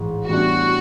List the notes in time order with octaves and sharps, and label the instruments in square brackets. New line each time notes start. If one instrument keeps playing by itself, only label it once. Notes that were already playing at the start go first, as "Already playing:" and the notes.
Already playing: [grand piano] A1 G#2 G#3
[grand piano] A2 E3 G3 B3 D4 [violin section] F#4